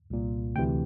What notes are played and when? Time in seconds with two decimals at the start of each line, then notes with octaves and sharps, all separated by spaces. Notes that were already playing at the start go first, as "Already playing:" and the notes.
0.10 C2 A#2
0.56 D2 C3 E3 G5